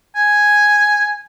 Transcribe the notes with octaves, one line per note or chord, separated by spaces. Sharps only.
G#5